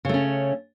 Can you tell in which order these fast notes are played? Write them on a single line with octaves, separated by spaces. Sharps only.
C#3 A3 C#4